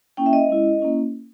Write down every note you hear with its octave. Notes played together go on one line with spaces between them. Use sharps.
A#3 C#4 E4 G5
E5
D#5
G#3 C#4 E4
A#3 C#4 E4